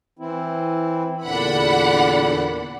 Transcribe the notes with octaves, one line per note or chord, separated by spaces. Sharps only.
E3 C4 E4
E2 A#2 D3 D4 F#5 B5